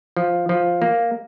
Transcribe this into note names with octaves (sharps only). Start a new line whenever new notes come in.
F3
F3
A#3